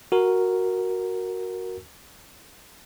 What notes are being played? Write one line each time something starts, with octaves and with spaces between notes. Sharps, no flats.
F#4 A#4